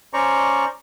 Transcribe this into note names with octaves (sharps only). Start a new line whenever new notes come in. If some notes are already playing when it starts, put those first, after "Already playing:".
C#4 C5 D5 A#5 C#6